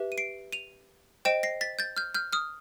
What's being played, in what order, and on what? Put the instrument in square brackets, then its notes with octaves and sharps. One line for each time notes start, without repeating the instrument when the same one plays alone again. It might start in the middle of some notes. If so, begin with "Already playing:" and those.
Already playing: [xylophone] G4 B4 E5
D#7
C7 D7
D#7 F7
C5 D#5 G5 D7 E7
A#6 C7
A6 B6
G6 A6
F6 G6
F6 G6
D#6 F6